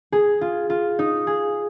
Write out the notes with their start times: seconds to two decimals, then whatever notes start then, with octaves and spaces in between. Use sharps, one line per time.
0.12 G#4
0.41 F4
0.70 F4
0.99 D#4
1.27 G#4